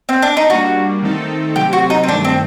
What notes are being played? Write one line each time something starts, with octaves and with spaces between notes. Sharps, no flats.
C4
D4
D#4
G3 A#3 D4 F#4
D#3 A3 C4 D#4 A4
C3 F#3 A3 C4 G4
F#4
D#4
C4
G2 D#3 A3 D4
C4